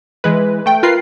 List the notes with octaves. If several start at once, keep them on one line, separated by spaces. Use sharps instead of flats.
E3 G#3 B4
A3 G5
F4 A#4 B4 C7